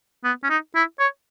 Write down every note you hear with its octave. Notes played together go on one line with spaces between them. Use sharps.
B3
C#4
D#4
E4
C#5